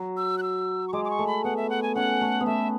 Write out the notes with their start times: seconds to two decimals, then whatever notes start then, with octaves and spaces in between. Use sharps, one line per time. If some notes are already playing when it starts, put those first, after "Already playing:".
Already playing: F#3
0.17 E6
0.38 F#6
0.42 E6
0.88 C#6
0.93 G#3 D6
1.05 D6
1.10 C#6
1.19 A3
1.27 B5
1.44 B3 F#5
1.57 E5
1.70 F#5
1.82 G#5
1.95 C#4 F#5
2.21 A3
2.41 B3
2.46 A3 E5